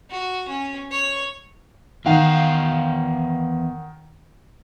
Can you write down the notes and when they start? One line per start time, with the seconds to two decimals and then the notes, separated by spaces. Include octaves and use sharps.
0.10 F#4
0.49 C#4
0.92 C#5
2.06 E2 D#3 F5 F#5